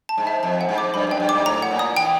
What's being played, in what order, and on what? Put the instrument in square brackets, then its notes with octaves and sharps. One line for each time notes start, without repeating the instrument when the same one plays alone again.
[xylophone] A5
[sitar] G#2
[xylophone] E5
[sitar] F2 [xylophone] A5
[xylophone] F#5
[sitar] G#2
[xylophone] D6
[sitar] G2 [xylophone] B5
[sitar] F#2 [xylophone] G5
[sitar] G2
[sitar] G#2 [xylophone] D6
[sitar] A2 [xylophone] A#5
[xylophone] F#5
[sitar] A#2
[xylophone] D#6
[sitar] E3 [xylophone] G5